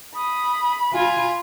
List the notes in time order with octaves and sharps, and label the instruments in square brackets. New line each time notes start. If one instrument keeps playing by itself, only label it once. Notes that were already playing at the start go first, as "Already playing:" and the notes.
[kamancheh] B5 [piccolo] D#6
[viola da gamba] F4 [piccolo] G#5